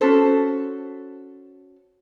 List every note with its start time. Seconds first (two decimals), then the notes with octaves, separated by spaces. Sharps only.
0.01 C#4 F#4 A4 C5